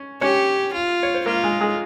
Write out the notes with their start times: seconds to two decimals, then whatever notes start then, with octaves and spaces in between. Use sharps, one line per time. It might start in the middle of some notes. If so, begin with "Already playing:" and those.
Already playing: C#4
0.21 C#4 G4 C#5
0.74 F4
1.03 C#5
1.14 C5
1.26 A#3 F4 A#4
1.44 G#3 G#4
1.61 G#3 G#4